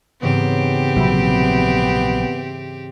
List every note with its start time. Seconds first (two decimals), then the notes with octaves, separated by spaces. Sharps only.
0.22 G#2 C#3 E3 B3 C4 G4
0.97 A#1 C3 F#3 E5 B5